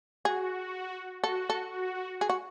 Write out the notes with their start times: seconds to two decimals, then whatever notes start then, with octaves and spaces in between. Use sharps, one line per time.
0.25 F#4 G#4
1.23 F#4 A4
1.50 A4
1.72 F#4
2.21 G#4
2.30 F#4